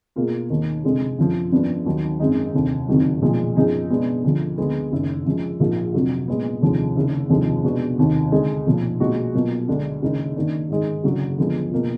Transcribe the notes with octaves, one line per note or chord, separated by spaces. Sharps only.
B2 A#3 F4 G#4
D#2 D#3 A#3
F1 F2 D3 G#3
F#2 D3 F3
G#1 F#2 F3 B3 D4
D#2 D#3 F#3
G#1 F#2 D#3 G#3 D#4
F1 D#2 D3
F#1 F2 D#3 F#3
B1 A#2 F3 G#3
F#2 F3 B3 D#4 G#4
B2 G#3 B3 D4
D2 D3 F3
D2 D3 G#3 B3
F#1 F#2 D#3
F#2 F3 G#3
A#1 G#2 F3 A#3 F4
F1 F2 D3 F#3
A#2 G#3 B3
F1 D#2 D3 F3 G#3
F#1 F#2 D#3
F1 D#2 D3 F3 G#3
B2 G#3 B3 D4 F#4
F1 D#2 D#3
D2 D3 G#3 D#4
B1 A#2 F3
B1 A#2 G#3 D#4 F#4
B2 F#3 A#3 F4
D2 D3 G#3 D4
F#1 F#2 D#3 G#3 D#4
F#2 D#3 A#3 D4
G#2 D#3 G#3
F#1 F#2 D3 F#3
D2 D3 F3 G#3 B3
B2 A#3 F4